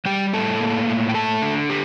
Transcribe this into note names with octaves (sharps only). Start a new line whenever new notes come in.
G3 G4 G5
A2 A4 A5
A#3
A2
G5
A3 A4 A5
D3
G4